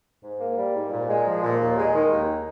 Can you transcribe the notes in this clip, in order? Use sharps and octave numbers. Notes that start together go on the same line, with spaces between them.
G#2
A#3
G3
G#2
A#2
G#3
F3
A#2
D#2
G#3
D#3
D#2